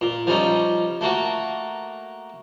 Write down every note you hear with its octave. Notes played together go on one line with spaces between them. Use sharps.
A#2
F3 G3 C#4 D#4
A3 A#3 F#4